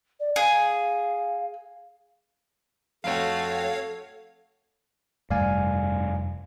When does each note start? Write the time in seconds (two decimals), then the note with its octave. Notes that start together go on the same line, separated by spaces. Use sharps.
0.20 D5
0.36 G#4 F5
3.04 F2 A3 F#4 A4 C#5 F5 G5
5.31 F1 G2 G3 A3 D5 F5 G#5